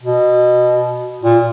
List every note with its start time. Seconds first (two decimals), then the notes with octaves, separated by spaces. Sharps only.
0.03 B2
1.24 A#2